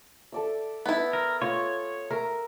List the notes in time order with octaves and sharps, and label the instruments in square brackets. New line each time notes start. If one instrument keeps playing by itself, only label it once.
[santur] A4 D5 E5
[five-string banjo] B3 E4
[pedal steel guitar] A#4
[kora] F4 [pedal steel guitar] C#5 [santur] C#6
[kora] A#4 [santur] E5